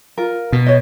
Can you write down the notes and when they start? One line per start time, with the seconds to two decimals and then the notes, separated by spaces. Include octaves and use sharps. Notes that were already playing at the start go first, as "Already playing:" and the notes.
0.18 F4 A#4
0.53 B2
0.66 C#5 D#5